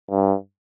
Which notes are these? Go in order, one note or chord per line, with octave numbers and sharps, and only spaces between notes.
G2